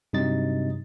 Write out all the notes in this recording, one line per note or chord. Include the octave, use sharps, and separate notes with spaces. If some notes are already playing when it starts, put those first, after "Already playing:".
G2 C3 F#3 D#4 D#5 A6